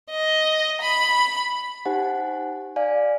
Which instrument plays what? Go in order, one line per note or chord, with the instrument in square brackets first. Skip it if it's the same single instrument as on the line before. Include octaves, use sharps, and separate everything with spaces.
[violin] D#5
B5
[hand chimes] D#4 G4 C5 F#5 G#5
D5 F5 G#5